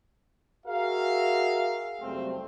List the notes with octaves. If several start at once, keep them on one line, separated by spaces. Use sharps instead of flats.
F#4 G#4 A#4 E5 F5
F#1 G3 A3 C4